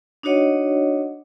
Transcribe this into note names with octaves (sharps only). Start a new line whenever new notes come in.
D4 D#4 F#4 C#5 D#5 F#5